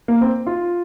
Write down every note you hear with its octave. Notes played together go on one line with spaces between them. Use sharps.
A#3
C4
F4